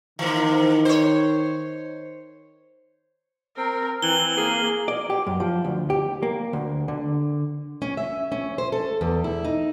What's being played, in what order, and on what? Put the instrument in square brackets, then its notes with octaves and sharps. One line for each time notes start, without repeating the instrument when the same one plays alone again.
[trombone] D#3 [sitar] E3 A#3
[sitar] C5 C#5
[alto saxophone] C4 [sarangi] A#4
[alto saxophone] E3 [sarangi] C4 [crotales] F#7 G7
[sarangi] A#3 [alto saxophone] G#4
[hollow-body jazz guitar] D5
G4
F#2
F3
D2
G4
A#3
D2
D3
[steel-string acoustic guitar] C#4
E5
C#4
C5
A4
E2
E4
D#4